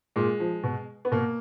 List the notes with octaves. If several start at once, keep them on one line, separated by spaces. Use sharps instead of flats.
A#2 G#3
F3
B2
B3
B2 A#3